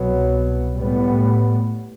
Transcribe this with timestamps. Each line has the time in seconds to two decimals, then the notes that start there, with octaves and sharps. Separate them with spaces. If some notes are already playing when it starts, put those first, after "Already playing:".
Already playing: C2 B2 F#3 B3
0.76 A2 G3 B3